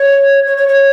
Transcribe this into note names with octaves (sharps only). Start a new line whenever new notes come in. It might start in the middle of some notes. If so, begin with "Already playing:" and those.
Already playing: C#5
C#5
C#5
C#5